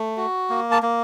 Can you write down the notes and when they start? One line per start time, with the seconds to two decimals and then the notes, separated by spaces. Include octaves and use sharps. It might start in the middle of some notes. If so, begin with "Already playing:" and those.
Already playing: A3
0.17 F#4
0.50 A#3
0.71 A5
0.82 A#3